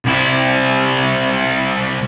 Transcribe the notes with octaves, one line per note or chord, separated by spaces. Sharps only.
C2 E4